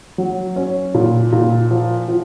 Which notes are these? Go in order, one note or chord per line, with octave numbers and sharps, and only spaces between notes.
F#3
C#4
A#2
A#2
F3
F3